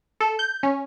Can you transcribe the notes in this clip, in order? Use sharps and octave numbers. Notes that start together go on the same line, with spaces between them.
A4
G6
C#4